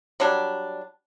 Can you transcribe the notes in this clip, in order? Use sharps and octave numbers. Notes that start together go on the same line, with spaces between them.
F#3 G3 D4